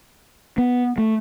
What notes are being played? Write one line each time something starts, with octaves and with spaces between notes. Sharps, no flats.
B3
A3